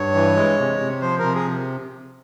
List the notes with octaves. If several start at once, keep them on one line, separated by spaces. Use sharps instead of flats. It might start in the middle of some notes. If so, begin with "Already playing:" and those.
Already playing: G2 C#5
E3
G#3
C3
C3
F3 C5
C3 A#4
G#4